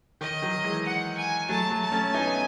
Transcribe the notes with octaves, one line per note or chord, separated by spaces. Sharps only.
D#3 D#5
D#3 F#3
E3 G#3
F#5
G#5
F#3 A3 A5
F#3 A3
A5
A3 C#4
B3 D#4 G#5